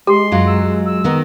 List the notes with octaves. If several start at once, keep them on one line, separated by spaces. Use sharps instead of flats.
G#3 G4 C6
F#2 F#3 F4
E6
E6
D#3 B3 D#4